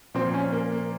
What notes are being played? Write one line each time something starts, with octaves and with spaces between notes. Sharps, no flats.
A#2 F3 C4
C#4
A#3
A#3